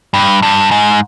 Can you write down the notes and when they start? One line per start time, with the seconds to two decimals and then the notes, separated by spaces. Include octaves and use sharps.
0.14 G2
0.43 G2
0.71 G#2